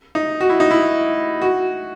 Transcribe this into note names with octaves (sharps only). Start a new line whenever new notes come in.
D#4
F#4
E4
D#4
E4
F#4